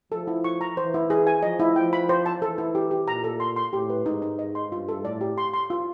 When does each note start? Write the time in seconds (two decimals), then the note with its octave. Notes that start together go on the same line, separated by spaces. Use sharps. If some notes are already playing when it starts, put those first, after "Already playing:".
0.12 F3 A4
0.27 E4
0.44 C#6
0.61 A#5
0.77 E3 C5
0.94 E4
1.10 G#4
1.27 G#5
1.43 F3 D#5
1.60 E4
1.76 F3 G5
1.93 B5
2.09 C5
2.26 A5
2.41 E3 A4
2.58 E4
2.75 G4
2.91 G4
3.08 A#2 A#5
3.24 A4
3.40 C6
3.56 C6
3.73 A2 G4
3.90 B4
4.06 G#2 D#4
4.22 D#4
4.39 D#5
4.55 C6
4.71 G2 F4
4.89 A4
5.04 A2 D5
5.21 G4
5.38 C6
5.54 C6
5.70 F4